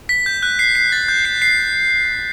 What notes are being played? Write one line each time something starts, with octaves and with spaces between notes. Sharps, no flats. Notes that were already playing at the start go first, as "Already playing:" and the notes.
B6
G6
F#6
C7
C7
A6
G6
C7
C7